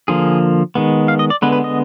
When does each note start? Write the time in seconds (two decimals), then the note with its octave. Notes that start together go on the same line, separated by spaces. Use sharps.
0.08 D3 F3 A#3 G#4
0.75 D#3 G#3 B3
1.08 F5
1.19 D#5
1.30 D5
1.42 D3 G#3 B3 B4
1.53 B4
1.64 D#5